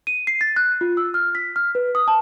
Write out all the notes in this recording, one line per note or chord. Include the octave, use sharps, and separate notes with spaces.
D#7
C7
A6
F#6
F4
E6
F6
B6
F6
B4
D#6
A5